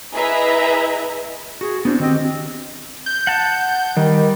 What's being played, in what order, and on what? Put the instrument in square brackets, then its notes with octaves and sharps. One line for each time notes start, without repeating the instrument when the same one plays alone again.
[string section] E4 G#4 B4 D#5 E5 A#5
[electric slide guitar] F#4 [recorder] G#4
[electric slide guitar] B3 C4 E4 [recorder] D4
[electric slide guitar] D#3 F#4 G4 [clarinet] C4 [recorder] D#5
[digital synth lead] G6
[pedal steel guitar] F#5 A5
[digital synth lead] D#3 [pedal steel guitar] G3